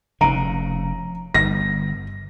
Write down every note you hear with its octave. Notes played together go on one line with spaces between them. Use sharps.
F1 C#3 A#5
G1 A#6